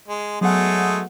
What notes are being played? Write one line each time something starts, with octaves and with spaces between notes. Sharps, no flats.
G#3
F#3 G#3 A3 B3 G#4 F#5